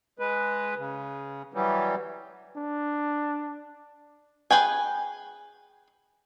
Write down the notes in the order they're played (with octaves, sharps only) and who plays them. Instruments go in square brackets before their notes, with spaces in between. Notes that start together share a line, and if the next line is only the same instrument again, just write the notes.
[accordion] G#3 B4
C#3
E3 F#3 G3
[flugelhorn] D4
[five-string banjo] G#4 B4 G5 G#5